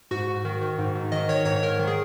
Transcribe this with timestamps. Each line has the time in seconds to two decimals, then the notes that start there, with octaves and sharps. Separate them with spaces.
0.11 G#2 F#4
0.28 G#2
0.45 D#3
0.62 D#3
0.78 G#2
0.95 G#2
1.12 D#3 D#5
1.29 D#3 C#5
1.45 G#2 C#5
1.63 G#2 A#4
1.79 D#3
1.87 G#4